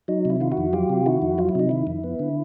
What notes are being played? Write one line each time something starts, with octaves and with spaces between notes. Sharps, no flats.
F#3 D#4
C3 E4
D#3 F4
E4 F#4
F2
F#3 F4 G4
C3
D#3 E4 F#4
F2
F#3 F4
E4
C3 D#4
D#3 E4
F2
B3
D3